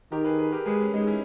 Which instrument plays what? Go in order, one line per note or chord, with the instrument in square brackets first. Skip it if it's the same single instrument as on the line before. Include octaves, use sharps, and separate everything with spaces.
[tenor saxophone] D#3 [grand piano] G4 A#4
[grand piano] G#4 B4
G#4 B4
G4 A#4
[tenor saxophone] G#3 [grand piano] G#4 B4
[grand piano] C#4
[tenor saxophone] G#3 [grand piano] D#4
[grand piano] C#4 E4